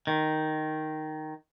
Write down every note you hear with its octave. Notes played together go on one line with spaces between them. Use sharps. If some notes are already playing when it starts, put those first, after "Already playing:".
D#3